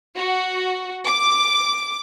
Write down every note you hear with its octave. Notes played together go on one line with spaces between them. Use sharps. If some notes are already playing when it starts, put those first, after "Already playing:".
F#4
D6